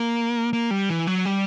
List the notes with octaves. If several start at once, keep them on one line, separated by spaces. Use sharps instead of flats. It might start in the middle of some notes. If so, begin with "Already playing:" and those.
Already playing: A#3
A#3
G3
E3
F#3
G3